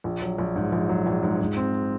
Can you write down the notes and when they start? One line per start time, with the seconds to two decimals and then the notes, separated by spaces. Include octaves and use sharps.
0.04 A#1
0.22 F#3
0.38 A#1
0.56 G#2
0.72 A#1
0.89 F#3
1.06 A#1
1.23 G#2
1.40 G#2
1.56 C4